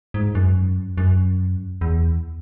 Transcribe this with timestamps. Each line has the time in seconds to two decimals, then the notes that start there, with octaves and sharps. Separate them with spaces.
0.14 G#2
0.35 F#2
0.97 F#2
1.81 E2